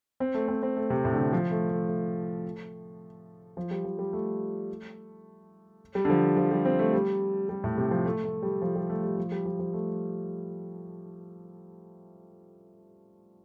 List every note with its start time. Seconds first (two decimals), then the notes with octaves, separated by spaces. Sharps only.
0.20 C4
0.34 A3
0.48 C4
0.63 C4
0.76 A3
0.90 C3
1.05 A2
1.13 D3
1.19 C3
1.33 F3
1.51 A3
1.70 A3
1.88 A3
3.57 F3
3.71 G3
3.85 F3
3.99 G3
4.13 A3
5.95 G3
6.05 D3
6.10 F3
6.37 F3
6.51 G3
6.65 C4
6.79 A3
6.93 G3
7.49 G3
7.64 A2
7.78 C3
7.91 F3
8.05 A3
8.24 A3
8.43 G3
8.62 F3
8.76 G3
8.89 A3
9.04 G3
9.18 F3
9.32 G3
9.46 F3
9.59 F3
9.73 A3